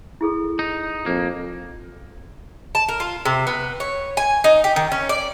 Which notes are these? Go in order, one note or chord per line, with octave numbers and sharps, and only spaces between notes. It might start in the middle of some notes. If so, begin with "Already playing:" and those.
E4 G#4 A4
D#4
F2 A#3
A5
A#4
F4
C3
B3
C#5
G#5
D#4
G4
D#3
C#4
D5